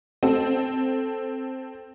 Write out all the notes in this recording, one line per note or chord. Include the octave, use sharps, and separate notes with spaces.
C4 A4